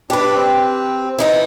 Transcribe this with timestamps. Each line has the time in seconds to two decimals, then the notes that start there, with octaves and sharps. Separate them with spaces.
0.10 D4 G4 B4
0.35 C4
1.19 E3 D#4 E4